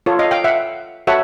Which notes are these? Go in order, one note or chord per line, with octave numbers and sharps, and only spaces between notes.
F4 A4 C#5
D#5 F5
F5 G5
E5 F#5
F#4 A4 C#5 E5 F#5